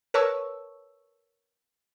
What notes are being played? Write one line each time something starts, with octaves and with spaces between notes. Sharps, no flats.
A#4 B4 C#5 A5 C#6 E6